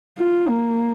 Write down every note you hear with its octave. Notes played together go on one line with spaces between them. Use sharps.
F4
A#3